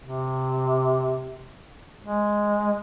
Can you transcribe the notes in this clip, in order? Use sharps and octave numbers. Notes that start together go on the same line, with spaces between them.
C3
G#3